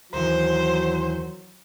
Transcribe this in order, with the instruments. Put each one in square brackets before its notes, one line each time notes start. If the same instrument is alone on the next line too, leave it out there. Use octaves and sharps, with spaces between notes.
[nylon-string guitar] D#2 E3 [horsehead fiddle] F#3 [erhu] C5